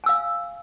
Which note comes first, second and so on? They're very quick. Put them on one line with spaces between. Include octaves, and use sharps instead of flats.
G#5 E6 F5